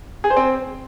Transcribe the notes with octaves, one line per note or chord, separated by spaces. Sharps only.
G#4
C5
C4